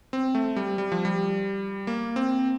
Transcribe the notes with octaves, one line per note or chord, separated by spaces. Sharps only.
C4
A3
G3
G3
F3
G3
A#3
C4